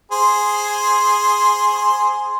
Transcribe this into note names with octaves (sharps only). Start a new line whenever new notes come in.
G#4 C5 C6